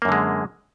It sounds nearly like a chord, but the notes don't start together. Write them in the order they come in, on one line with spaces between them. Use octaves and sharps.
A#3 F#2 D3 G#3